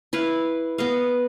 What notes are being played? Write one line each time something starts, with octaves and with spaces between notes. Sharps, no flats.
E4 B4 F5
B3 D#5 F5